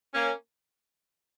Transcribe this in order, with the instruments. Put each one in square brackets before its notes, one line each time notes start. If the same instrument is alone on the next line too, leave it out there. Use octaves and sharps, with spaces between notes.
[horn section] A#3 C#4